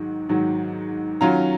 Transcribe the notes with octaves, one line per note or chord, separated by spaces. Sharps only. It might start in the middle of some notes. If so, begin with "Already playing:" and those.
Already playing: G#2 D#3 F#3
G#2 D#3 F#3
D#3 F#3 C#4 F4 A#5